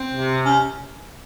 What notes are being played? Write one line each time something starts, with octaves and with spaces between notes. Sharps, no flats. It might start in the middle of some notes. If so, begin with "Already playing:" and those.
Already playing: C4
C3
C#4